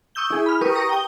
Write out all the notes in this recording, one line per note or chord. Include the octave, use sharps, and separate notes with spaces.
C#6 D#6 E6 G6 G7
E4 G#4
B5 F6
G4 A#4 B4 C#6 D#6
A#5 C#6 D#6 A#6
G5 D#6 G7